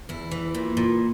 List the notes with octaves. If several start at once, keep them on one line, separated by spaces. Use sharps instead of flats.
E2 E4
E3
A#2
A#2